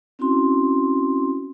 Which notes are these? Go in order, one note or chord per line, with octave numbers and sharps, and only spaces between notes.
C4 C#4 E4 F#4 C6